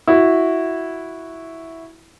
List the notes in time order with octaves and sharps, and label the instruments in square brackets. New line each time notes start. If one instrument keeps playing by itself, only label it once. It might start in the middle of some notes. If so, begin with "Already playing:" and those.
[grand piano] E4 F#4